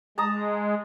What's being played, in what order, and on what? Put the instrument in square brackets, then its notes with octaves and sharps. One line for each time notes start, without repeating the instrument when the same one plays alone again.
[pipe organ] G#3 [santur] A5 A#5 D#6